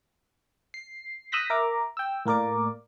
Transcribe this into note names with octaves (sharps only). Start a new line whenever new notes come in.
C7
D#6 E6 F#6 G6 A#6 B6
A#4 E5 A#5 D6
G5 E6
A2 A#3 A#4 D5 D6